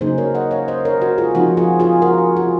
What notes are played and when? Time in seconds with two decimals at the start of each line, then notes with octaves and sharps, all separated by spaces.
0.01 C#3 F#3 A#3 D#4 G#4 C5
0.18 A#4 C#5
0.35 D#5 F#5
0.51 C#5 F5
0.68 C5 D#5
0.85 A#4 C#5
1.01 F#4 A#4
1.18 F4 G#4
1.35 F3 C4 D#4 F#4
1.57 F4 G#4
1.80 F4 G#4
2.02 F#4 A#4
2.37 F4 G#4